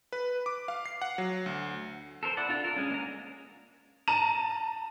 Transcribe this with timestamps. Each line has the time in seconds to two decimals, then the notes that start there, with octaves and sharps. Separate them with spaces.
0.12 B4
0.46 D6
0.68 F5
0.86 C7
1.02 F#5
1.18 F#3
1.46 D2
2.23 A4 A#4 C5
2.37 E4 D5 F#5
2.49 D4 F4 A4
2.64 A#4
2.76 G#3 C#4
2.91 A#3 A#5
4.08 A5 A#5 D#7 E7